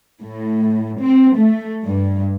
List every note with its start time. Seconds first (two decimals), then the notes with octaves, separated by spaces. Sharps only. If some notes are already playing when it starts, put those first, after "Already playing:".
0.22 A2
1.01 C4
1.38 A3
1.84 G2